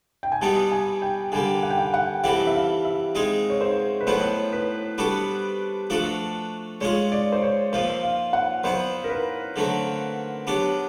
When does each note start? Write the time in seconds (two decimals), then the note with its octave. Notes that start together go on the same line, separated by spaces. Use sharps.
0.23 G5
0.32 G#5
0.41 B2 G3 B3 D#4 A5
0.72 G#5
1.02 G5
1.32 D3 G3 A#3 G#5
1.63 F#5
1.70 G5
1.78 F#5
1.94 F#5
2.24 E3 G3 C4 E4 A4 F#5
2.47 E5
2.55 F5
2.85 E5
3.15 G#3 C4 D#4 G#4 D#5
3.50 C#5
3.61 C5
4.01 B4
4.07 A2 F#3 B3 E4 C5
4.53 B4
4.98 G3 B3 D4 F#4 A4
5.90 F3 A3 D4 F#4 A4
6.81 G#3 C#4 F4 G#4 C#5
7.12 D5
7.32 C5
7.42 C#5
7.73 A#2 F3 A#3 C5
8.03 F5
8.33 F#5
8.64 F#3 B3 E4 C5
9.04 A#4
9.10 B4
9.56 D3 F#3 A3 C4
10.47 F#3 B3 D4 G4